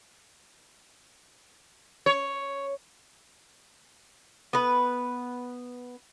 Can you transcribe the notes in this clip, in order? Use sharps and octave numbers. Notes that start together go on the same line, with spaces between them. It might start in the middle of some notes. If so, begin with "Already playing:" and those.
C#5
B3 B4